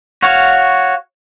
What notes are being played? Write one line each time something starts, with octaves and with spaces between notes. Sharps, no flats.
F#4 C#5 F5